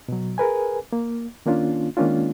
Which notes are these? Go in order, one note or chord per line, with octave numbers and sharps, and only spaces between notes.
B2 F#3
G#4 A#4 B4 G#5
A#3
D#3 A#3 C#4 D4 F4
D#3 G#3 A#3 C#4 D4 F4